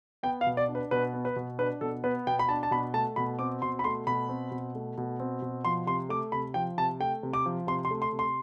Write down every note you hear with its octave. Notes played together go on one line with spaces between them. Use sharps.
B3 G5
F5
B2
D5
D4
B4
B2 B4
B3
B4
B2
D4 B4
B2 A4
B3 B4
B2 G5
B5
D4 A5
A5
B2 B5
A3 A5
B2 B5
C4 D6
B2 C6
B5
A3 C6
B2 B5
C4
B2
A3
B2
C4
B2
F3 C6
C3 C6
A3 D6
C3 B5
F3 G5
C3 A5
A3 G5
C3
D6
F3
C3 C6
C6
A3
C6
C3
C6